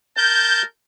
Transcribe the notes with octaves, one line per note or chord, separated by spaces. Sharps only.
A#4 A5 G6